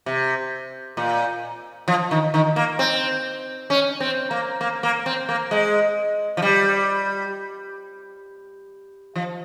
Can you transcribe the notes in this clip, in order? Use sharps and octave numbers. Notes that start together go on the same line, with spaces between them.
C3
A#2
F3
D#3
D#3
A#3
C4
C#4
C4
A#3
A#3
A#3
C4
A#3
G#3
F3
G3
F3